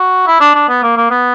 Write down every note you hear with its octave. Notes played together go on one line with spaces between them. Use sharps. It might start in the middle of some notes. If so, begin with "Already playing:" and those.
Already playing: F#4
E4
D4
D4
B3
A#3
A#3
B3